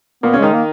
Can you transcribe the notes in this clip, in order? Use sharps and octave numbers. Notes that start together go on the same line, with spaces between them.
A#2 A#3 B3
C#3 C#4
D#3 G#3 D#4
A#3